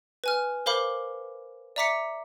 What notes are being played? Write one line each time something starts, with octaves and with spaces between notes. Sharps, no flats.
B4 G#5 F6
A#4 C5 F5 B5 D6
D5 E5 A#5 D6 B6 C#7